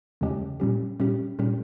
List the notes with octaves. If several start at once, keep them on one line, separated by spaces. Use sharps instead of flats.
E2 C#3 G#3 C#4 G4
A#2 G3 C#4 G4
A#2 G3 C#4 G4
A#2 G3 C#4 G4